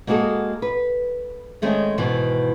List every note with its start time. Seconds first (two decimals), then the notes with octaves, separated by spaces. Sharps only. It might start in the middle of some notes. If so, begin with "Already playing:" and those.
0.07 G#3 A#3 B3 F#4 G#4 A4
0.62 B4
1.62 D#3 G#3 A3 C4 C#4
1.98 G#2 B2 D#3 E3